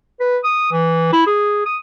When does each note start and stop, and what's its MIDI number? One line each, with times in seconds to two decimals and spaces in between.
0.20 0.37 71
0.44 0.70 87
0.72 1.09 52
1.12 1.24 64
1.27 1.61 68
1.66 1.76 87